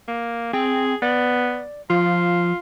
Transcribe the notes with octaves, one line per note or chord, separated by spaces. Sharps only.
A#3
C4 G#4 G5
B3 D5
F3 F4